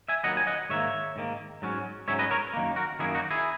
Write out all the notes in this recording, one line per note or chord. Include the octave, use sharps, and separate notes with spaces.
E5 G#5
D#2 D#3 F#3 B3 D#5 F#5
G#5
D#5 F#5
G#2 D#3 A#3 C#5 E5
G#2 D#3 A#3
G#2 F#3 C#4
G#2 F#3 C#4 C#5 E5
B4 D#5
A#4 C#5
F#2 D#3 A#3
F#4 A#4
F#2 D#3 A#3 E4 G#4
D#4 F#4
E4 G#4